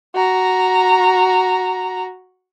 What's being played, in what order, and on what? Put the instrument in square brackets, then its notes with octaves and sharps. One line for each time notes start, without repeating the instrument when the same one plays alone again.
[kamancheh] F#4 A#5